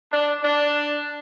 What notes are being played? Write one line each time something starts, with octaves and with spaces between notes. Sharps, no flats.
D4
D4